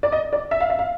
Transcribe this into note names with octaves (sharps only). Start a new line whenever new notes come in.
D5
D#5
D5
E5
F5
E5
F5